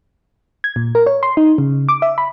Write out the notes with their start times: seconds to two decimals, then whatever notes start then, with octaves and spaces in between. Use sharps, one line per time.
0.64 G#6
0.76 A#2
0.95 A#4
1.07 C#5
1.23 C6
1.37 D#4
1.58 C#3
1.89 D6
2.02 E5
2.18 B5